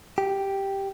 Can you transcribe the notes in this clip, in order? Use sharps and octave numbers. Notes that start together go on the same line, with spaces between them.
G4